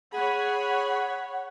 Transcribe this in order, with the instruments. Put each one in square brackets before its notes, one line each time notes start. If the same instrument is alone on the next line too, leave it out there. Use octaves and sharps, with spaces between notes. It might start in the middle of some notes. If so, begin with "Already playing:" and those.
[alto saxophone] G#4 [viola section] C#5 B5 [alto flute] F#5